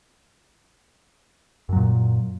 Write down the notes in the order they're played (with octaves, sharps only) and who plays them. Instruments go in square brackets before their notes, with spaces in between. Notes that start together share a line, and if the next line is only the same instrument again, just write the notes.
[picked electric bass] F#2
F#3
A#2